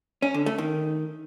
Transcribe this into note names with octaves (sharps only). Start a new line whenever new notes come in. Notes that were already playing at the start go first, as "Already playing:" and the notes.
C#4
D3
A3
D#3